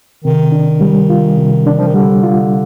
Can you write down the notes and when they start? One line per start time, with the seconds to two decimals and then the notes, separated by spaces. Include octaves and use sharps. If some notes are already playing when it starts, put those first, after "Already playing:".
0.24 C3 D#3
0.52 D4
0.81 G3
1.10 F4
1.38 C3
1.67 D4
1.79 F3
1.87 D#3
1.94 D3 G3
2.24 F4